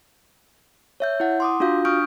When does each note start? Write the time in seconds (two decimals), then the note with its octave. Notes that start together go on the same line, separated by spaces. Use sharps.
1.00 C#5 E5 G6
1.20 E4 F#5
1.40 C6 D6 D#6
1.60 D4 F4 F#4 F5 G6
1.85 D4 C#6 D#6 F6 G6 D7